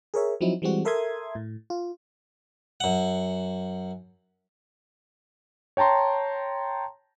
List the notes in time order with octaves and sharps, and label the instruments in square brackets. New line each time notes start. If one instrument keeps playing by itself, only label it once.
[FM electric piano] G#4 A#4 C#5 E5
F3 F#3 C4 D#4 E4
E3 G3 G#3 C4 F#4
A4 A#4 E5 C6 D#6 G#6
A2
F4
[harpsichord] F#2 F#5
[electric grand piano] C#5 G5 A5 A#5 C6